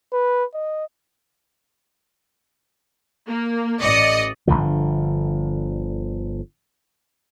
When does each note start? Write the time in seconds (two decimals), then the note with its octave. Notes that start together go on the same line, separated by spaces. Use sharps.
0.13 B4
0.54 D#5
3.27 A#3
3.81 A1 D5 D#5 C#7
4.47 G1 D#2 D3 F3